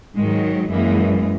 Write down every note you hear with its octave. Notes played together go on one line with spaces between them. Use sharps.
G#2 D#3 F#3 G#3
F#2 E3 G#3 A#3